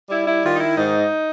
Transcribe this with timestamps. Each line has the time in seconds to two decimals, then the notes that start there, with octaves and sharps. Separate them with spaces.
0.09 G3 E4
0.26 E4
0.43 D#3 F4
0.53 D#4
0.60 E4
0.76 G#2 D#4